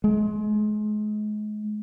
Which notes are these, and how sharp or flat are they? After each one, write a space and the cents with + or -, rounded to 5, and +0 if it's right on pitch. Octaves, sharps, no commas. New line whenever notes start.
G#3 +30